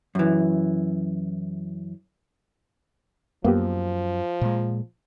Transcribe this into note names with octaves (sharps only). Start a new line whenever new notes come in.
F#2 E3
F#2 F3 A#3 B3 G4
A#2 G#3